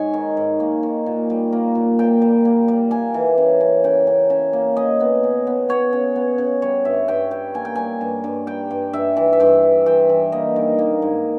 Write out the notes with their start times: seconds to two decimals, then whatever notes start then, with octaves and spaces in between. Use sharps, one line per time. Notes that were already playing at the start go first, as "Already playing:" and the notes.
Already playing: G#2 C#5 G#5
0.14 D#3
0.37 G#2
0.60 A#3
0.83 D#3
1.06 A#2
1.30 G3
1.52 A#3
1.75 A#2
1.99 A#2 G5
2.22 G3
2.45 A#3
2.68 G3
2.91 A#3 G#5
3.14 E3
3.38 C#3
3.61 C#3
3.84 C#3 G5
4.07 C#3
4.30 C#3
4.53 A#3
4.76 C#3 D#5
5.00 B3
5.23 C#3
5.47 B3
5.69 B3 C#5
5.93 C#3
6.16 B3
6.38 C#3
6.62 G3 C#5
6.85 G2 E5
7.08 G2 G5
7.31 G3 G5
7.54 A#3 G#5
7.65 G5
7.75 G3 G#5
8.01 G2
8.24 G2
8.47 G3 G5
8.71 G2
8.93 G2 E5
9.17 E3
9.33 E5
9.40 G2 G5
9.63 E3
9.86 E3 G5
10.09 E3
10.32 A#3 D#5
10.56 D#3
10.79 A#3
11.02 G#2